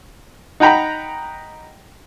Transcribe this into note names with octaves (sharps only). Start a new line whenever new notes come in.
D#4 F#5 G5 A#5 B5